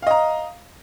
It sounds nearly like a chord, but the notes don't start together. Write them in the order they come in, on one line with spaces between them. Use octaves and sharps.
F5 D#5 A#5